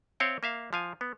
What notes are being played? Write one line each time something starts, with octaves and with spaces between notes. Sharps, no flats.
C4 C#5 E5 F5 G5
A#3 E5 F5
F3 F5 G#5
B3